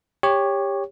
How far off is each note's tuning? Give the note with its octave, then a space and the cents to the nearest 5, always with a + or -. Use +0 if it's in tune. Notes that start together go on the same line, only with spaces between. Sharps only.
G4 +20 C#5 +0